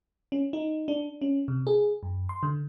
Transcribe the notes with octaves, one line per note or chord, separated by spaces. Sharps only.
C#4
D#4
D4
C#4
C3
G#4
F#2
C6
D3